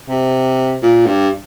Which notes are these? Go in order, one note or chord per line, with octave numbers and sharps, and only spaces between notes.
C3
A#2
G2